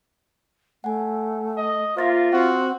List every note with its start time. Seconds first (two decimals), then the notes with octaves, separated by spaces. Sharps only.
0.84 A3 F#5 G#5
1.57 D#5
1.97 A#3 F4 C5 E5 A6 A#6
2.32 C4 F#4 F#5